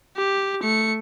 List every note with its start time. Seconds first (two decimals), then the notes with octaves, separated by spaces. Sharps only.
0.17 G4
0.63 A3 C#7